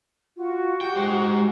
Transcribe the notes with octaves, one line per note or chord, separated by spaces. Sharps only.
F4 F#4
G4 G5
G#3 C5